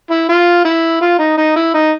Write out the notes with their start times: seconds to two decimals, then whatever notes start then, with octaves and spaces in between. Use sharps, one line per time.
0.10 E4
0.29 F4
0.65 E4
1.01 F4
1.19 D#4
1.37 D#4
1.56 E4
1.74 D#4